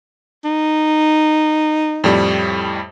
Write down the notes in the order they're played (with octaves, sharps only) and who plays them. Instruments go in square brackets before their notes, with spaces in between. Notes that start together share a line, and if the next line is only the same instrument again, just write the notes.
[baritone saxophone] D#4
[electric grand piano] F2 A2 G3